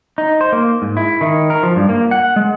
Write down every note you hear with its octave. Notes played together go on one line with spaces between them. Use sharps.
D#4
C5
A#3
G#2
E4
D#3
A#4
F3
G2
A#3
F#5
G#3